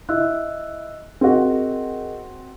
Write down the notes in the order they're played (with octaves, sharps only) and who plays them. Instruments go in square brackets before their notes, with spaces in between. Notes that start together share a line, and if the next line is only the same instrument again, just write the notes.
[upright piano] E4 [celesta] D#5 E6 F#6
[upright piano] C4 F#4 [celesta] G#4 A#4 D#5